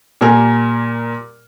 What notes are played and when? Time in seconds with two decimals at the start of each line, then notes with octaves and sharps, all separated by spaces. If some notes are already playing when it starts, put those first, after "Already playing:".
0.21 A#2 G3 A#4 G#5